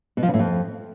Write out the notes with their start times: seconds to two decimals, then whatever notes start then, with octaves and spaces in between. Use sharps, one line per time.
0.17 B2
0.23 F3
0.28 C#3
0.34 A2
0.39 F2